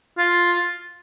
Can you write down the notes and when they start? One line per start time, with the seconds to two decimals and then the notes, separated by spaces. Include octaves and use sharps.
0.18 F4